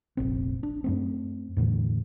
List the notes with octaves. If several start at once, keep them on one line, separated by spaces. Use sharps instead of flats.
F1 A#1 C4
D4
F#2 A3 C4
E2 A2 D3 E3